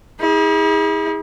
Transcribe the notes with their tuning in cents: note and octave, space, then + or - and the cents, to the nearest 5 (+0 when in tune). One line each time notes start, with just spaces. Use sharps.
E4 -45 G#4 -25